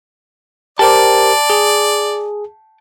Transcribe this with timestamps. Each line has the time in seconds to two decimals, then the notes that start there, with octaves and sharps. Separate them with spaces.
0.79 G4 A#4 C5 D5 G5 A5
1.50 G#4